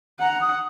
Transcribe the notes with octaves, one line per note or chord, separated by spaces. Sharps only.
F#5 A#5
D#6